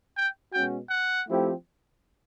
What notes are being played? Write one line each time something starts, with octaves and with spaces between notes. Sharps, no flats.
G5
B2 G#3 C#4 F#4 G5
F#5
F3 A3 C4 E4 G4